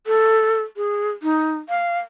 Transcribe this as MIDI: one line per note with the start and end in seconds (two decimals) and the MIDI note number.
0.07 0.62 69
0.77 1.09 68
1.23 1.57 63
1.69 1.99 77